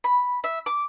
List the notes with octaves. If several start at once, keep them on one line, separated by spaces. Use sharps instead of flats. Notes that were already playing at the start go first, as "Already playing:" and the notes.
B5
E5
D6